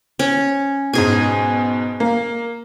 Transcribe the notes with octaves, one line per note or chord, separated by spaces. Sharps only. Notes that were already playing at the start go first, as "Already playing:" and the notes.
C#4
G#2 B2 G#4 G#5
A#3